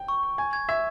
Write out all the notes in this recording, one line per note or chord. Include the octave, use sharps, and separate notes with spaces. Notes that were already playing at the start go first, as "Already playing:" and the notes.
Already playing: G5
C#6
C#6
G#5 G#6
G#6
E5 G#6